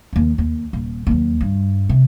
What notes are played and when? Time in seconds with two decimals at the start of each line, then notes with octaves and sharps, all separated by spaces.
0.13 D#2 F3
0.38 D#2
0.73 D#1
1.07 D#2 F#3
1.41 G2
1.89 C3